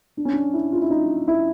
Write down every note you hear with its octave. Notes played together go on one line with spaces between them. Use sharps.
D4
C#4
D4
E4
F4
E4
D#4
E4